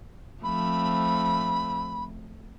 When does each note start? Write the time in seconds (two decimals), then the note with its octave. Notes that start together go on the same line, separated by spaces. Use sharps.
0.43 F3 A3 C4 B5